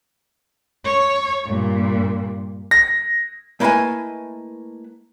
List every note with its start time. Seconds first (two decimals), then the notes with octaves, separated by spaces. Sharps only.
0.85 C#5
1.45 G2 A#2
2.71 A#6
3.60 A3 A#3 E4 B4 D#5 G#5